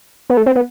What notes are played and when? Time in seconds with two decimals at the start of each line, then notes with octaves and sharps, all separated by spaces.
0.30 B3
0.37 A3
0.46 C4
0.55 B3